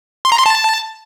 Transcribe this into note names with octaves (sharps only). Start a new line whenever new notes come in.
C6
A#5
C6
A5